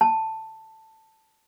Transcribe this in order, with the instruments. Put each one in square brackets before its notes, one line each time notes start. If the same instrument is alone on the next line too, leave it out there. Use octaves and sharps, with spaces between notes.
[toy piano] A5